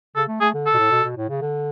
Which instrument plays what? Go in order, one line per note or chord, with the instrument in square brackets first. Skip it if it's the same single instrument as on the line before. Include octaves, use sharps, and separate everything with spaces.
[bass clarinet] C#3 [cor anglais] A4
[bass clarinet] A3
[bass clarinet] A3 [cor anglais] G#4
[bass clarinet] D3
[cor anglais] A4
[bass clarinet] B2
A2
B2
B2
A2
C#3
D3